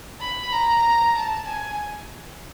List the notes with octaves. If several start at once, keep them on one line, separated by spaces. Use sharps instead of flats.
B5
A#5
A5
G#5